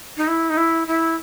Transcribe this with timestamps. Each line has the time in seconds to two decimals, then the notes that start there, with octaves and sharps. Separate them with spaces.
0.17 D#4
0.28 E4
0.50 D#4
0.57 E4
0.88 E4